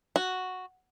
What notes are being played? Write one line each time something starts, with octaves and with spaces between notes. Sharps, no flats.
F#4